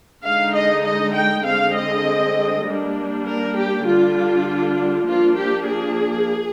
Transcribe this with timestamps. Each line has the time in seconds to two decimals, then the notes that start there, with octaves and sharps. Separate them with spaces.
0.23 D3 G#3 D#4 F5
0.54 D#5
0.84 D#5
1.14 G5
1.44 D3 G#3 C4 F5
1.75 D#5
2.65 G3 A#3 D4
3.26 A#4
3.55 G4
3.85 D3 G3 D4 F4
5.07 F3 A#3 D4 F4
5.37 G4
5.67 G#4